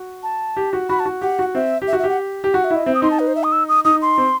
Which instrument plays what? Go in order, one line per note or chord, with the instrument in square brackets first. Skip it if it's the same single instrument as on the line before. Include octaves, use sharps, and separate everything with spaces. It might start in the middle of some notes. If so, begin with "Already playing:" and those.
Already playing: [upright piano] F#4
[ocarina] A5
[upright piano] G4
F#4
[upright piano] F#4 [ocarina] B5
[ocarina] A5
[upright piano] F#4
[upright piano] G4 [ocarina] F#5
[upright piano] F#4
[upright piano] C4 [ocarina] E5
[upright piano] G4
[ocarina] E5
[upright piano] F#4
[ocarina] E5
[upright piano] G4
[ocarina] F#5
[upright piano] G4
[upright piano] F#4 [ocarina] F#5
[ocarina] E5
[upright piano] E4 [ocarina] D#5
[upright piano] C4 [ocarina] E5
[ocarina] D#6
[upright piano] D#4 [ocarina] C6
[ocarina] A5
B4
C5
E5
D#6
E6
D#6
[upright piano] D#4 [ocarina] D#6
[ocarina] C6
[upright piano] C4